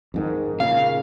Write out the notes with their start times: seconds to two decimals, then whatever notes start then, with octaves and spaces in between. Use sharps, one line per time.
0.14 F2 G#2 D#3
0.60 A#2 C#3 F5